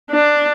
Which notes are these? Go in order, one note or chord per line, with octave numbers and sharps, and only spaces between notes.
D4